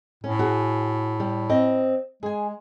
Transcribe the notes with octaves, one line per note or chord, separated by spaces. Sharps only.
A2 C#4
F#4 G#4
G3
C4 D#5
G#3 G#4 G#5